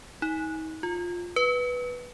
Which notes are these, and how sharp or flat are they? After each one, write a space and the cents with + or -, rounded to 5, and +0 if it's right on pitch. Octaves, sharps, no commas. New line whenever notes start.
D#4 +35
F4 +10
B4 -5